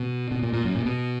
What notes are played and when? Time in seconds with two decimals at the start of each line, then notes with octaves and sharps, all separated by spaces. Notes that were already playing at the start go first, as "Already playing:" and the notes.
Already playing: B2
0.31 B2
0.43 A#2
0.53 A#2
0.64 F#2
0.75 A#2
0.86 B2